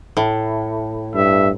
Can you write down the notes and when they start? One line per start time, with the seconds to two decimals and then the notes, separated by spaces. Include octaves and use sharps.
0.17 A2
1.15 G2 E5